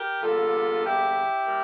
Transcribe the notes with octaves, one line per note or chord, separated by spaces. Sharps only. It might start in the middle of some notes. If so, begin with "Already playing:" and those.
Already playing: G4 A#4
E2 D3 G3 A#3 F4 A4
E4 G4
G3 A#3